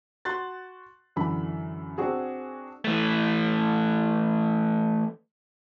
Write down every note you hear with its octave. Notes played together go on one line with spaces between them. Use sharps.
F#4 C6 F#6 A6
F#2 D3 E3 B5
C4 D4 F#4 G#4
E3 A3